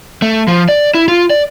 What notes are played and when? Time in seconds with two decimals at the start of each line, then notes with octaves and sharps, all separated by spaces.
0.22 A3
0.48 F3
0.68 D5
0.94 E4
1.08 F4
1.30 D5